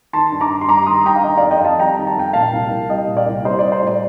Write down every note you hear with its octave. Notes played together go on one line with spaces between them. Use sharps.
D#3 A5 C6
G2
A#5 D6
G2
C6
G3 A#5 D6
D#3 C6 D#6
G2 G5 A#5
F5
D#3 D#5 G5
F2 D5 F5
D#5 G5
F2 F5 A5
G3 G5 A#5
D#3
A5
F2 G5
A#2 F5 A5
C2
C2
G3 D#5 G5
A#2
D5 F5
C2
G3 C5 D#5
G3 D5
C5
A2 D5